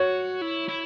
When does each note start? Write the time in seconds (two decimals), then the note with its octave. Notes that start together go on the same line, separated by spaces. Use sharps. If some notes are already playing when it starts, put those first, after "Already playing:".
Already playing: F#4 C#5
0.42 E4
0.69 E4